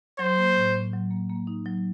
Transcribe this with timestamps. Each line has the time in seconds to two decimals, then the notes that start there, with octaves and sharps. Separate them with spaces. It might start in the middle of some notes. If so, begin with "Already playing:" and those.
0.19 F#3 C5
0.37 A#3
0.56 A2
0.75 A2
0.93 F#3
1.10 A#3
1.30 A#3
1.47 D#4
1.66 F#3